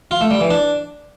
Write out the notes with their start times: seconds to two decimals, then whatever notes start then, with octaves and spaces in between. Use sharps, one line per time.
0.11 F4
0.21 A3
0.31 G3
0.41 E3
0.50 D4